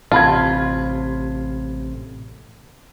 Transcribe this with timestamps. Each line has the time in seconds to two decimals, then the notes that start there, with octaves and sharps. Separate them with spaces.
0.12 A1 C3 F4 A5 B5 G#6